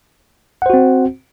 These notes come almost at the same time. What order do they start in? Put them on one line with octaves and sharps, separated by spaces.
F#5 C5 F#4 C4